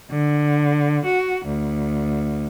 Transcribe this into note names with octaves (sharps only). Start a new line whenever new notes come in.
D3
F#4
D2